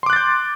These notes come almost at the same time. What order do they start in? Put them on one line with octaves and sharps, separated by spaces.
C6 D6 F#6 A6 G6